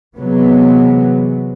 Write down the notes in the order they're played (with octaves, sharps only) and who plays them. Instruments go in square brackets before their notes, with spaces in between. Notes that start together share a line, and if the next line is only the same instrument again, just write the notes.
[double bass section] C3 E3 F#3 G#3 B3